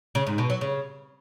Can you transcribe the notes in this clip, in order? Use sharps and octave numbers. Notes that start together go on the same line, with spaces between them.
C#3
G#2
B2
F#3
C#3